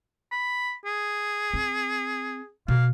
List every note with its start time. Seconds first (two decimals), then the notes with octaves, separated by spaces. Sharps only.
0.32 B5
0.85 G#4
1.54 C4
2.68 B2 F5